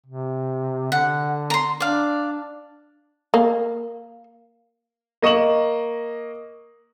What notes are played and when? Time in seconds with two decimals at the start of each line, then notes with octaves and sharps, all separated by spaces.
0.06 C3
0.92 D3 F#5
1.50 A#5 C6
1.80 D4 D5 F5
3.34 A#3
5.22 A#3 D#5 C#6 E7 F#7